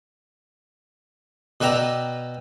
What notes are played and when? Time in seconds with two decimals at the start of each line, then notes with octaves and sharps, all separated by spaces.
1.61 B2 B4 D5 E5 G5 A#5